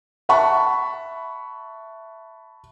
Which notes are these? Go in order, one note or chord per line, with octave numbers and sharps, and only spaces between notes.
E5 F#5 A5 B5 C#6